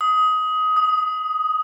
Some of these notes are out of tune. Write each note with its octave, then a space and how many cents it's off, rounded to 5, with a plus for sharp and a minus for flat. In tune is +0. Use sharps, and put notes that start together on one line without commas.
D#6 +20
D#6 -10